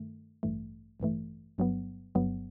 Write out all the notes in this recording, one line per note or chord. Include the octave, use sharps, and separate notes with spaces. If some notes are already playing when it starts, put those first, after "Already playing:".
Already playing: G2 D#3 A3
A1 G2 E3 A3
A1 G2 E3 A3
G1 G2 F#3 B3
G1 G2 F#3 B3